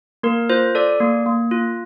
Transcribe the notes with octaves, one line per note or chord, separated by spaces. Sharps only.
A#3 A#4
F4 C5
A4 D5
A#3
A#3
F4